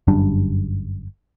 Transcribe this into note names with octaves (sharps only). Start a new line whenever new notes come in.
G1 F#2 G3 D4